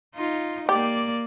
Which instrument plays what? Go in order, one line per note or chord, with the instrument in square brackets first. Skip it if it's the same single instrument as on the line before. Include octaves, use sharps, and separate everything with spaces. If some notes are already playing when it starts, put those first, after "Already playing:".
[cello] D#4 F4
[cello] A#3 D5 [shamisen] G4